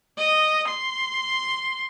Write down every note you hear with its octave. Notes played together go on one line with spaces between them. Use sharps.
D#5
C6